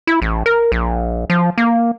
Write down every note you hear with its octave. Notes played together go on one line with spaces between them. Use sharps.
E4
A1
A#4
A#1
F3
A#3